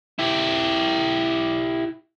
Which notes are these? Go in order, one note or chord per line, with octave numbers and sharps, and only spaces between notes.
E4 G4